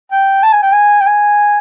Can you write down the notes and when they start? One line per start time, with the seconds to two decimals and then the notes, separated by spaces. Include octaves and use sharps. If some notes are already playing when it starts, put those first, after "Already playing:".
0.12 G5
0.43 A5
0.53 G#5
0.63 G5
0.73 G#5
1.01 G5
1.06 G#5